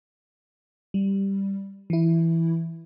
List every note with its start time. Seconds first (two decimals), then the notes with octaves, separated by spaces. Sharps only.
0.94 G3
1.90 E3 E4